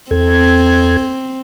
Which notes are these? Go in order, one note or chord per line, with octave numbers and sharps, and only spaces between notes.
E2 C4 A4 G#6